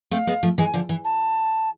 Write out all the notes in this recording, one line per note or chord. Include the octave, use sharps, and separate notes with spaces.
A3 C4 F5
G#3 B3
F3 A3
E3 G#3 G#5
D3 F3
E3
A5